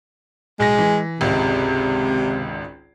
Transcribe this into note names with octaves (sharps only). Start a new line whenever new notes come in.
B1 G#3 A#6
E3
G#1 C#2 C3 G#3